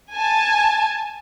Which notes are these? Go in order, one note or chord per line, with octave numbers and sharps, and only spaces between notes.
G#5 A5